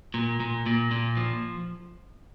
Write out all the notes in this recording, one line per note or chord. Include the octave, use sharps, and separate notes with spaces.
A#2
A#2
A#2
A#2
F3